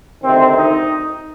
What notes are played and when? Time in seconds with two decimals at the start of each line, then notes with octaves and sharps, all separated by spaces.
0.23 D2 C3 D#3 C4
0.56 D#4